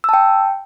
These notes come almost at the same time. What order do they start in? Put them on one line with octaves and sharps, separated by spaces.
E6 A5 G5